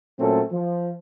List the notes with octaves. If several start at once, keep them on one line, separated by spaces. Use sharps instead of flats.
A#2 F#3 A3 C4 C#4 A4
F3